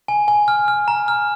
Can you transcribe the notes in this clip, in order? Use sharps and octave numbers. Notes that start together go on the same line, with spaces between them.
G#5
G#5
F6
F6
A#5
F6